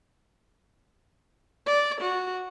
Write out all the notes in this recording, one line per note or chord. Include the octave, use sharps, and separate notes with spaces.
D5
F#4